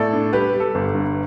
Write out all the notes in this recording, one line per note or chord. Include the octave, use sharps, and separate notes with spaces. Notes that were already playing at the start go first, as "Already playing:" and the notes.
Already playing: A2 A4 D5
D4
G3 G4 B4
G3
A4
G1
G2